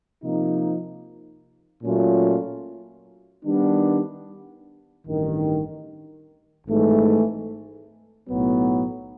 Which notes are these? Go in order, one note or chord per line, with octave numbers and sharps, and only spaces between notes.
C3 F3 A#3 D#4
A#2 F#3 A3 C#4 F4
D#3 G3 B3 D4
A1 G2 D#3
G#1 G#2 E3 A3
B1 A2 F#3 B3